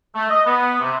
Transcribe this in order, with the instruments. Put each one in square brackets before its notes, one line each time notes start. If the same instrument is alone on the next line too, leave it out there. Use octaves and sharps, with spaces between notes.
[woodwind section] A3
D#5
B3
C3